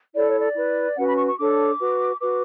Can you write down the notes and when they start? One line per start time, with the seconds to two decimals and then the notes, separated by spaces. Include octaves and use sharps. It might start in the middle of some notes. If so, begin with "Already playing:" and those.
0.14 E4 A4 C#5 D5
0.27 C#5
0.40 D5
0.55 E4 B4
0.96 C#4 F#4 B4 F#5
1.07 B5
1.17 C#6
1.27 C#6
1.38 D4 A4 C#5 D6
1.79 F#4 B4
2.20 F#4 B4 D6